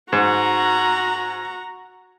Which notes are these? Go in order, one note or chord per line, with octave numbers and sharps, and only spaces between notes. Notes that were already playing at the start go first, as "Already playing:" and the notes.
G#2 F#4 A#5